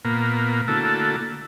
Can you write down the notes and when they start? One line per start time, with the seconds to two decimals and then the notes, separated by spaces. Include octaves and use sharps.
0.05 A#2 A#3 B3
0.68 D3 A3 A#3 E4 F#4 A4